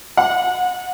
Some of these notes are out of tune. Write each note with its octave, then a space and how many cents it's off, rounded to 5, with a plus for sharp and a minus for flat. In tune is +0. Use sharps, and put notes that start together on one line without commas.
F#5 -30